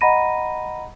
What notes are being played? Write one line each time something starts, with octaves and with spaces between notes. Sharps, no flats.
D#5 F#5 A#5 B5 A#6 D#7